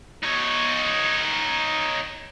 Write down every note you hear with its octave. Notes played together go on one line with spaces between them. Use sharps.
D#4 C#5